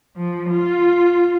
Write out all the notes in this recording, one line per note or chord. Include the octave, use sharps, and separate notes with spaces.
F3
F4